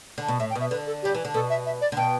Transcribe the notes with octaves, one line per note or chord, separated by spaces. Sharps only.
D3
B2
A2 E5
G5
B2
E5
D3 B4
A4
G3 G4
E3
D3
B2 A4
E5
E5
D5
D3
B2 G5